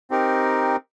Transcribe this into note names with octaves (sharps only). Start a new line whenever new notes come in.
C4 D#4 G4 A#4